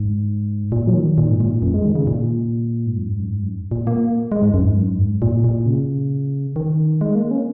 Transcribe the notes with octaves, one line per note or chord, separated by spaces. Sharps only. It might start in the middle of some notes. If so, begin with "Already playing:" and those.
Already playing: G#2
A#2
F#3
D#3
A#2
G#2
A#2
F#2
G#3
D#3
C#3
A#2
G#2
F#2
G#2
F#2
G#2
F#2
A#2
A#3
G#3
G#2
F#2
G#2
F#2
G#2
A#2
A#2
C#3
D#3
G#3
A#3
C#4